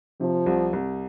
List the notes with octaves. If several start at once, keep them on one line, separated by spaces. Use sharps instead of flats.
C3 F3
C2
C2